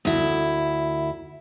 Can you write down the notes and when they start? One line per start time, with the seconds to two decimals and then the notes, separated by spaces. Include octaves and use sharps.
0.05 D2 E4